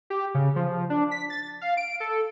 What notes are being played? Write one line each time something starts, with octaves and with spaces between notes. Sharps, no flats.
G4
C#3
F3
D4
B6
A6
F5
D7
A4